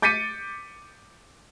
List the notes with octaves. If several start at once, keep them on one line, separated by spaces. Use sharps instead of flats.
D6 G6 A6 B6 C#7 D#7